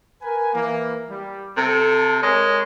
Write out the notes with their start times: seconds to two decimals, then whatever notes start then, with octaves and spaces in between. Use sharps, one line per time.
0.22 A#4 B4 G#5
0.53 E3 A#3
1.09 G3
1.57 C3 A4
2.23 G#3 A#4 C#5